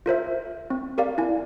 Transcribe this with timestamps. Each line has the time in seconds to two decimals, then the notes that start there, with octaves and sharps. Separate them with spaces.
0.06 F4 A#4 C5 E5
0.70 C4
0.98 G4 A#4 D5 F5
1.18 E4 G#5